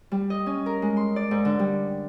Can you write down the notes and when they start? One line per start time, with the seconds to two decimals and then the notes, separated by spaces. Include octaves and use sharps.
0.12 G3
0.30 D#5
0.46 C#4
0.66 A#4
0.82 G#3
0.97 C6
1.16 D5
1.31 G#2
1.45 D3
1.59 G3